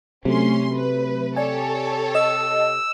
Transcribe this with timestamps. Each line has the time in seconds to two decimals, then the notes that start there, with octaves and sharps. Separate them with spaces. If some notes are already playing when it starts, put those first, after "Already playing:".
0.25 C3 F#3 A3 C#4 C6
0.73 B4
1.36 G4 A4 C#5 D5 G#5
2.15 D#5 E6